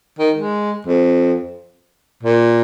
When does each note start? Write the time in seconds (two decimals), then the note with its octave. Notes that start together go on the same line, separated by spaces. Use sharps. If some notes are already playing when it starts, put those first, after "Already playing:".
0.19 D#3
0.36 G#3
0.87 F2
2.23 A#2